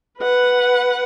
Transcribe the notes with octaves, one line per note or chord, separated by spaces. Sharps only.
B4 F#5